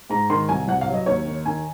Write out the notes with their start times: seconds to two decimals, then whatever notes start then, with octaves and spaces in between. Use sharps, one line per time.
0.10 G#2 A#5
0.30 D#3 C6
0.49 C2 G#5
0.68 C2 F#5
0.81 F5
0.88 F#3
0.94 D#5
1.06 D#2 C#5
1.26 D#3
1.46 D#3 G#5